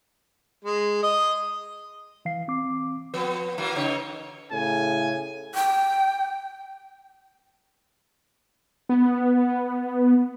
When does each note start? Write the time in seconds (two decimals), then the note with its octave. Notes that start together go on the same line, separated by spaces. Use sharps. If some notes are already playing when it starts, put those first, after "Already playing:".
0.65 G#3
1.03 D#5
2.25 E3 F5 C7
2.48 C4 D6
3.14 F3 B3 B4
3.58 E3 F#3 A#3
3.76 C#3 D#4 C#5
4.52 A2 C#3 G#5
5.55 G5
8.89 B3